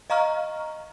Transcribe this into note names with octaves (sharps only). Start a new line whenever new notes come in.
D#5 F5 A#5 C#6 F6